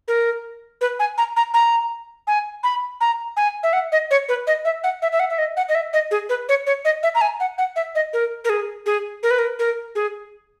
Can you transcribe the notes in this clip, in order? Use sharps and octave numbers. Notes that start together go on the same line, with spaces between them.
A#4
B4
G#5
A#5
A#5
A#5
G#5
B5
A#5
G#5
E5
F#5
D#5
C#5
B4
D#5
E5
F#5
E5
E5
F#5
E5
D#5
F#5
D#5
E5
D#5
G#4
B4
C#5
C#5
D#5
E5
A#5
G#5
F#5
F#5
E5
D#5
A#4
A#4
G#4
G#4
A#4
B4
A#4
A#4
G#4